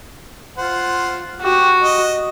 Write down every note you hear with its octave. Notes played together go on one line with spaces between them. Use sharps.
F4 C5 F#5
F#4 G4
D#5